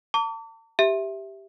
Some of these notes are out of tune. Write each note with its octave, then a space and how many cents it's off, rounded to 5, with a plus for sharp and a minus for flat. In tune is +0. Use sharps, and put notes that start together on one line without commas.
A5 +45 D6 -40
G4 +0 E5 +0